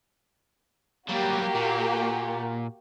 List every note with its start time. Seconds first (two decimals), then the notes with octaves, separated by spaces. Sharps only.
1.09 F#3 G3 A#3 F#4 G4
1.56 A#2